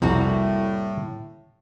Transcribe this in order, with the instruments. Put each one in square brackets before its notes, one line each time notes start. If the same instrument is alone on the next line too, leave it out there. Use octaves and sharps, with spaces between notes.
[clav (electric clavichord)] C2 F2 [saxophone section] A2 [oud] G3 A#3 F#4